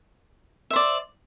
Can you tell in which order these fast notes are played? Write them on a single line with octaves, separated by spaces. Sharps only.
E5 C5 D5